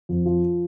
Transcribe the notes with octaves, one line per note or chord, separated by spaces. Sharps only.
F2
F3